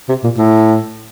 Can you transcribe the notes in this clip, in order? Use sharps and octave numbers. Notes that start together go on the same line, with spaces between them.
C3
A#2
A2